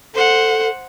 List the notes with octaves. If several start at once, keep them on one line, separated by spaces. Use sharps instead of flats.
A4 C5 F#5